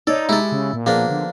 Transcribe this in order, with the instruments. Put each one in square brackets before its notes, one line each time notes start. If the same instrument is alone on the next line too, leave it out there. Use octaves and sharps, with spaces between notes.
[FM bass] D#4 [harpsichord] A4 [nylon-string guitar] C#5 D5
[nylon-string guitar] G#3 G4 [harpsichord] E4 A4
[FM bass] C#3
A#2
[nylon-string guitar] F3 B3 G#4 [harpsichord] A#3 D4
[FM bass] D3